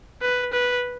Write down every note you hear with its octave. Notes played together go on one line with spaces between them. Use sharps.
B4
B4